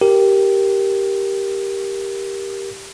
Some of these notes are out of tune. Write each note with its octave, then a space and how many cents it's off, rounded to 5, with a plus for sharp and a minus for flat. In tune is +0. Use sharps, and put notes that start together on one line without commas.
G4 -5 A#4 +0